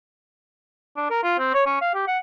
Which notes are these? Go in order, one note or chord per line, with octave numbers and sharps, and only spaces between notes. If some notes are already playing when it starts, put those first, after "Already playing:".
D4
A#4
F4
C4
C#5
C#4
F5
G4
F#5